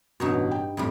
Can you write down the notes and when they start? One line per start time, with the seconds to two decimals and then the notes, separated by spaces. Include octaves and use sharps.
0.20 A1 G2 B2 D#4 C#5
0.51 G5
0.77 F2 A2 G3